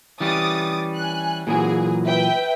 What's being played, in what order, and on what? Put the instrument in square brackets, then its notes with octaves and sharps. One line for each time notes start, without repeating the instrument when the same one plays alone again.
[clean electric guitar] E3 G3 C#4 [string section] D6 D#6 A6
[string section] G#5 F#6
[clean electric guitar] A#2 E3 F#3 [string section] G#4
[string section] B4 E5 G5